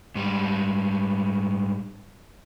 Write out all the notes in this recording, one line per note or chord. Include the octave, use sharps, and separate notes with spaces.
G#2 G3